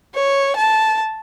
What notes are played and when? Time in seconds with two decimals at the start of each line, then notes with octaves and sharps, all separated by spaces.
0.15 C#5
0.56 A5